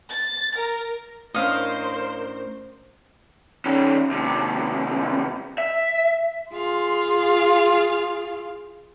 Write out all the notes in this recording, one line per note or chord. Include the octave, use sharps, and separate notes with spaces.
A6
A#4
A2 C#4 D4 A#4 C5 D#5 F5
D#3 C#4
D#2 C3
E5
F4 G#4 F5 C6